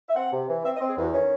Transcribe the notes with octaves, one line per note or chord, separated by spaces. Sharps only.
E5
C4 F#5
C3
E3
C4 E5
D#5
C4
G#4
E2 F#4
D#3 C#4